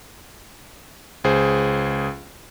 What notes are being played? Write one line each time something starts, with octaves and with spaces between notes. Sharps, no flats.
C#2 G#4 C5